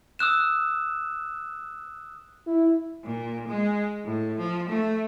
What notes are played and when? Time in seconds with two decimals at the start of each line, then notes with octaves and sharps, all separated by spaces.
0.19 D#6 E6 F#6 E7
2.47 E4
3.04 A#2
3.48 G#3
4.05 A2
4.38 F3
4.69 A3